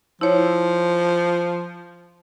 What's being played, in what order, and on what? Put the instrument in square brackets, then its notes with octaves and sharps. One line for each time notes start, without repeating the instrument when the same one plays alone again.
[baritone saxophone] F3 [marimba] E4 C#5